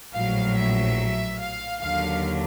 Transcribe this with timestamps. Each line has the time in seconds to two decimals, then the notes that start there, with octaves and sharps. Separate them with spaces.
0.14 A#1 A2 F#3 F5
0.56 E5
1.40 F5
1.81 D#2 D3 F#3 F5